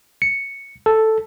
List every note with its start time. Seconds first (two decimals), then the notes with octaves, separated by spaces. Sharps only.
0.22 C#7
0.86 A4